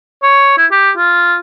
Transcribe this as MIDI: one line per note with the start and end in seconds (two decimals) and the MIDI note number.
0.23 0.53 73
0.58 0.66 64
0.72 0.91 67
0.97 1.36 65